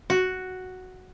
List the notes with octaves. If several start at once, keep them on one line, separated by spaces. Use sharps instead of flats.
F#4